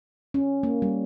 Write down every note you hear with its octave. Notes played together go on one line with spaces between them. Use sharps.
C#4
A#3
G3